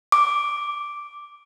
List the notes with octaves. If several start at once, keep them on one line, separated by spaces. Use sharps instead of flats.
D6